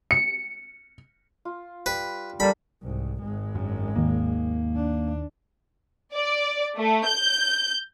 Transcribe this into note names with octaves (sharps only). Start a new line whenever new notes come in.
C#7
F4
G3 B4
G3 A#3 D4 A4 B5
C2 G#2
G#1 G#3
F#2
D#2 D#3 A#3
D4
D5
A3
G6